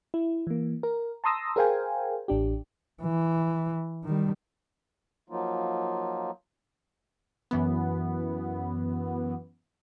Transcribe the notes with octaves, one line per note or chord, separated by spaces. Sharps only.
E4
E3 A#3
A#4
A5 A#5 C6 D#6 E6 A#6
G#4 A#4 C5 F5 G5 G#5
A1 D4 G4
E3
D#3 G3
F3 F#3 A#3 D#4 F4
F#2 E3 B3